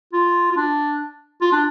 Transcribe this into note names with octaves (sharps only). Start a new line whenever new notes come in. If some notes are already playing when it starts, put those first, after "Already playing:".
F4
F4
D4
F4
D4